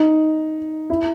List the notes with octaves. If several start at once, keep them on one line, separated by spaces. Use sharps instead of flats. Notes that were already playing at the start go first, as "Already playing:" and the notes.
Already playing: D#4
E4